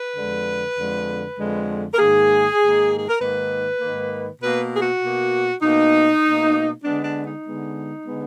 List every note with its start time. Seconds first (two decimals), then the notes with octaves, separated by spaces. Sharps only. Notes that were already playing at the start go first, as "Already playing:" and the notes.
Already playing: B4
0.16 F2 D3 G#3
0.77 F2 D3 G#3
1.37 F2 D3 G#3
1.94 A#4
1.98 G#2 D#3 A#3 G#4
2.59 G#2 D#3 A#3
2.97 G#4
3.08 A#4
3.20 G#2 D#3 A#3 B4
3.81 G#2 D#3 A#3
4.41 B2 A#3 B4
4.74 G#4
4.82 F#4
5.02 B2 A#3
5.62 B2 A#3 D#4
6.24 B2 A#3
6.84 D3 G#3 B3 D4
7.04 D4
7.25 D#4
7.44 D3 G#3 B3
8.06 D3 G#3 B3